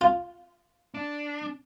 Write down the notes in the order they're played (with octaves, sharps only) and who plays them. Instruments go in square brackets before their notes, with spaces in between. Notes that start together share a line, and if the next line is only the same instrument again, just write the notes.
[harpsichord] F4
[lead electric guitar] D4